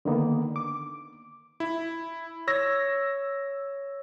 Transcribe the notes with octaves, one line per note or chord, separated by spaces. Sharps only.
D3 D#3 A#3 B3
D6
E4
C#5 E6 A#6